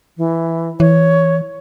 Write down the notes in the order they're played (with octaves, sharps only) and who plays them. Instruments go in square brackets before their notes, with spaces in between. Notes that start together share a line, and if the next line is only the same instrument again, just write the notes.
[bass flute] E3
[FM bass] E3 [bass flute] C#5